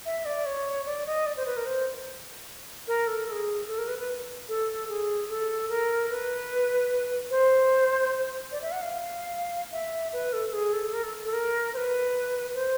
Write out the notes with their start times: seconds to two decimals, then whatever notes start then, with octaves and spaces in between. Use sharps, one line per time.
0.06 E5
0.25 D5
0.46 C#5
0.86 D5
1.06 D#5
1.26 D5
1.36 C5
1.46 B4
1.57 A#4
1.66 C5
2.88 A#4
3.07 A4
3.28 A4
3.32 G#4
3.68 A4
3.78 A#4
3.88 B4
3.99 B4
4.49 A4
4.89 G#4
5.29 A4
5.69 A#4
6.10 B4
7.31 C5
8.52 D5
8.62 E5
8.72 F#5
8.82 F5
9.72 E5
10.13 B4
10.33 A4
10.53 G#4
10.73 A4
10.93 A#4
11.03 A4
11.23 A4
11.33 A#4
11.74 C5
11.77 B4
12.54 C5